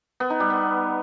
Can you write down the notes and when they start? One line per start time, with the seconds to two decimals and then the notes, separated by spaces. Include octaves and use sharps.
0.20 B3
0.30 D#4
0.40 G3
0.50 B3